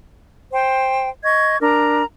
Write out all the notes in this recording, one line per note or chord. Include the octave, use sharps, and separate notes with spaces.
C5 G5
D#5 C#6 G#6
D4 A#4 A#5